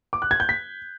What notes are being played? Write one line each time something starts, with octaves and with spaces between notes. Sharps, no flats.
D6
F#6
G#6
G6
B6